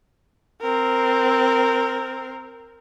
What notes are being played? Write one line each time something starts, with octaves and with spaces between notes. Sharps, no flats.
C4 A#4